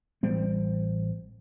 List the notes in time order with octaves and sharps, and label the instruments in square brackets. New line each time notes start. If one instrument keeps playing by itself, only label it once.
[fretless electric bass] A1 G3 C4